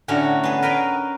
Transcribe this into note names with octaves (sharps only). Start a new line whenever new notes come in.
A2 D3 C#4 F#4 A#5
B3 G#4
A#4 B4 D#5 G5 A#5